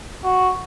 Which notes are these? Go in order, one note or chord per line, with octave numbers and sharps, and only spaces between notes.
F#4